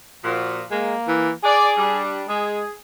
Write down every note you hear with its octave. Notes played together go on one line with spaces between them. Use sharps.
A#2 F3 F#4
G#3 A#3
E3
G#4 D5
G3 D4
G#3 G#4